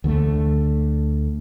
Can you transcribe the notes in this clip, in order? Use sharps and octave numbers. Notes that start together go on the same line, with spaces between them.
D2 D3 G#3 A3